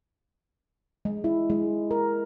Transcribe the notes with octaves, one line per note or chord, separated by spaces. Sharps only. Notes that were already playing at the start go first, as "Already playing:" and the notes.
G#3
E4
G#3
A#4